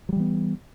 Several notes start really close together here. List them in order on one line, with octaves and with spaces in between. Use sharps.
F#3 G3 E3 B3